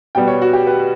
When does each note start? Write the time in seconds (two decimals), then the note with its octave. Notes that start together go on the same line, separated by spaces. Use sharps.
0.15 B2 G3 B3 G5
0.28 C#5
0.42 F#4
0.53 G4
0.67 B4